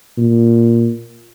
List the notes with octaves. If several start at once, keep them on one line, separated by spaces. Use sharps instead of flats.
A#2